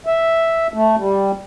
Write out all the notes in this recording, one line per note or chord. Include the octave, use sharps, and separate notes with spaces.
E5
A3
G3